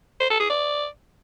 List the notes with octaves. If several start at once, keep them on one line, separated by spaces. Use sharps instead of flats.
C5
A4
G#4
D5